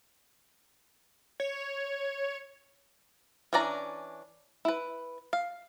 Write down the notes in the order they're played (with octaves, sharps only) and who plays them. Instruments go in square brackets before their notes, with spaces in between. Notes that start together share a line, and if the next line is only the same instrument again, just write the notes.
[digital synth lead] C#5
[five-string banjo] E3 C#4 D4 D5 A#5
E4 B4
F5